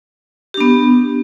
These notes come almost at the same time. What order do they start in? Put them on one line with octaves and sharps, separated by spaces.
G4 D4 B3